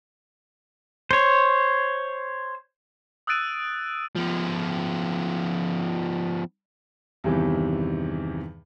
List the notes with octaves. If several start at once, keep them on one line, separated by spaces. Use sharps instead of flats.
C5 C#5
D#6 E6 F#6 A6 D7 D#7
F3 B3
E2 G2 C3 D#3 E3